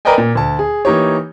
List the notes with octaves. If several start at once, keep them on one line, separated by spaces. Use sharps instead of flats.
A#4 B4 D5 D#5 G5 G#5
A#2
D2 A5
G#4
E3 A#3 D#4 G4 C#5